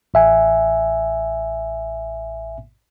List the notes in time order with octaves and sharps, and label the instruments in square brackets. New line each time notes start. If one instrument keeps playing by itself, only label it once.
[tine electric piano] A1 E5 G#5